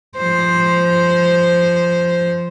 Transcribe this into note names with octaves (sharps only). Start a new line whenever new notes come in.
F3 C5